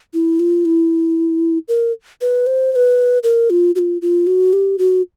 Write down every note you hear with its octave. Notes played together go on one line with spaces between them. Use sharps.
E4
F4
E4
A#4
B4
C5
C5
B4
A#4
F4
F#4
F4
F4
F#4
G4
F#4